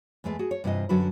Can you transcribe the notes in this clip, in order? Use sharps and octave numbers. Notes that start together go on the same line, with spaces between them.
E2 G#3 A3 B4
F#4 G#4
C#5
G2 C3 E3 F4 D#5
F#2 D3 F#3 F#4 A4 B4